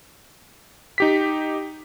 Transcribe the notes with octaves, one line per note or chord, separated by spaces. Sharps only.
D#4 G4 B6